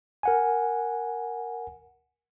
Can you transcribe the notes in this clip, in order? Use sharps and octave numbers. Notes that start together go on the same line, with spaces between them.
A#4 F#5 G#5